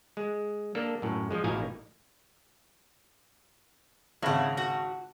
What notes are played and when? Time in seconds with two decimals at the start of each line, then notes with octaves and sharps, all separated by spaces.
0.17 G#3
0.75 A#3 D4 A4
1.02 F#2 A2
1.31 F3 G#3
1.44 A1 B2 D#4 E4 F5 G#5
4.22 G#1 C#3 E4 F#5
4.57 F#4